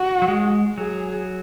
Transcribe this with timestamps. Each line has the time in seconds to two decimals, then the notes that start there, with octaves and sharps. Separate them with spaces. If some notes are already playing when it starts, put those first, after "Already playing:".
Already playing: F#4
0.22 F#3
0.28 G#3
0.77 F#3 G#4